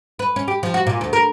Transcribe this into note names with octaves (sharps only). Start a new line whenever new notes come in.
B4
C#4
G4
F3
F#4
A#2
D2
A#4